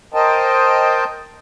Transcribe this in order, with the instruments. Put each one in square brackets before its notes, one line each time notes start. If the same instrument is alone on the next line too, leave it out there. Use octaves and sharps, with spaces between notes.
[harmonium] A#4 C5 D#5 G5 A5